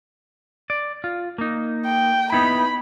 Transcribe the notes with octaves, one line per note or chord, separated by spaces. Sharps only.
D5
F4
A#3 D#4
G5
B3 D#4 E4 B5